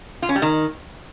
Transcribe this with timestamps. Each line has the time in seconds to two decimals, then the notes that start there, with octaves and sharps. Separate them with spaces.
0.22 F4
0.29 C#4
0.36 G3
0.42 D#3